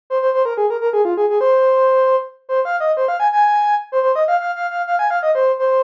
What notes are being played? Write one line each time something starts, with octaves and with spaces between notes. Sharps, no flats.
C5
C5
C5
A#4
G#4
A#4
A#4
G#4
F4
G#4
G#4
C5
C5
F5
D#5
C5
F5
G#5
G#5
C5
C5
D#5
F5
F5
F5
F5
F5
G#5
F5
D#5
C5
C5